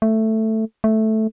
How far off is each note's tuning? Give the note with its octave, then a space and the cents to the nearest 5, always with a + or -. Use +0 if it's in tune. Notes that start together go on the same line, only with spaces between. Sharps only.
A3 +5
A3 -5